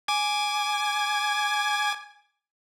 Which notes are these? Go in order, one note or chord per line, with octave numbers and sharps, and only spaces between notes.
G#5 D6 G#6